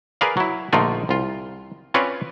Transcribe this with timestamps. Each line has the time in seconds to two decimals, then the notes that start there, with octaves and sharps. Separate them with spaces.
0.21 G#4 A#4 B4 D5 F5
0.37 F#3 E4
0.73 A#1 D3 A3 D#4 F4 D5
1.09 C2 F4
1.94 C4 C#4 F4 B4 C#5 D5